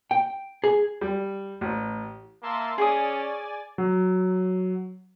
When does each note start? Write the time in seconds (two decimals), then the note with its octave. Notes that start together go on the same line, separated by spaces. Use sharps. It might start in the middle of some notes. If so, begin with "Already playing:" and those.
0.11 G5
0.64 G#4
1.01 G3
1.61 A1
2.43 A#3 E5 A5 C6
2.78 C#4 G#4 D5 G#5 D#6 A6
3.78 F#3